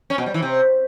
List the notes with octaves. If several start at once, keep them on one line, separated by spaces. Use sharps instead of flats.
C#4
B2
G3
E3
C3